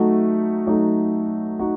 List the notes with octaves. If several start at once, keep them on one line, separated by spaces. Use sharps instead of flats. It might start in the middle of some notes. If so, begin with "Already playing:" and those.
Already playing: F#3 A3 D#4 F#4
F#3 A3 D#4 F#4
D#4 F#4